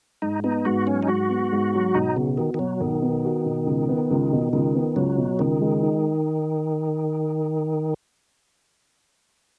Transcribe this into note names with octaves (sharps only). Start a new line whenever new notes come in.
G#2 D#4
B3 D#4
G#2 F#4
F#3 C#4
D#4
G#2 F#4
B3
G#2
F#3
B1 D#4
C#3 B3
D#3 F#4
D#3
B2 F#3
B1 D#3
B3
F#4
B2
C#2
B3
C#2
B2
C#2 D#3
B3
C#2 F#3
B2
C#2 D#3
G#3
D#4